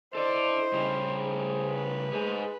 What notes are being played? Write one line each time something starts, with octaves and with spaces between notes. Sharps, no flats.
E4 A4 C5 D5 D#5
C#3 G3
G#4 C5
B4
G#3 G#4 C5 G#5